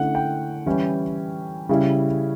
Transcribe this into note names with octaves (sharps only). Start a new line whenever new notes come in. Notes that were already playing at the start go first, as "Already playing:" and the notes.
Already playing: D3 A3 C#4 E4 F#5
G5
E3 G3 C#4 E4
C#3 G3 C#4 E4